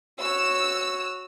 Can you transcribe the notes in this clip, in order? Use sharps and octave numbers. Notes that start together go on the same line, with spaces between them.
F#4 C#5 E6